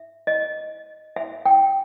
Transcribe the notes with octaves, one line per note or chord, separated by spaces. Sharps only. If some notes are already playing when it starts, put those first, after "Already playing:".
Already playing: E5
D#5
E5
G5